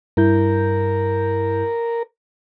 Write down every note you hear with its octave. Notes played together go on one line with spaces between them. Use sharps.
G2 E4 A#4 G6